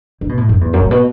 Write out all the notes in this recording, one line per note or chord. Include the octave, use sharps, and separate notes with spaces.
D3
B2
A2
F#2
E2
F#2
A2
B2